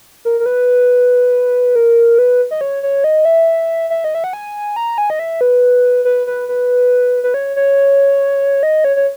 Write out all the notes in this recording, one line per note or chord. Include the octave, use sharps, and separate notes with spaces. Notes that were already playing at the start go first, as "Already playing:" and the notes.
A#4
A#4
B4
A#4
B4
D#5
C#5
C#5
D#5
E5
E5
D#5
E5
F#5
G#5
A#5
G#5
D#5
E5
B4
B4
B4
B4
B4
C#5
C#5
D#5
C#5
C#5